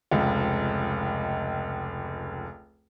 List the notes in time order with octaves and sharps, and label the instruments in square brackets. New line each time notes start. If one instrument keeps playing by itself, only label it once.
[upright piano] F1 C#2